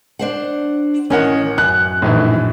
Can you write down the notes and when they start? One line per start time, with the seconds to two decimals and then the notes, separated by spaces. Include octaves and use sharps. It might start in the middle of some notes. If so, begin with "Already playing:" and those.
0.19 D4 C5 F#5
1.10 A1 D#3 C#4 A#4 F#5
1.58 F#2 F#6
2.02 A#1 A2 D#3 E3